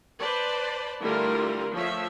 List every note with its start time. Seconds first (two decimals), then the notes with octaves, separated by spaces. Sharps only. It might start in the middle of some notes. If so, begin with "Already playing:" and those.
0.19 B4 C5 D5 A5
1.01 D3 G3 A3 E4 F4 A#4
1.72 F3 A3 C#5 E5